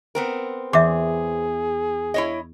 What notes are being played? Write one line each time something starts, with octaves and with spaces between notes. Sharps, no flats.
B3 C4 A#4
E2 G#4 E5 D6
E4 C#5 D#5